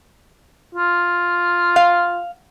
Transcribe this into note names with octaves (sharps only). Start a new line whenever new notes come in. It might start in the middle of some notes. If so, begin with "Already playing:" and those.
F4
F5